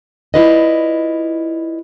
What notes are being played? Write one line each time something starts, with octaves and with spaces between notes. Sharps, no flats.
E4 F4 B4 D5 D#5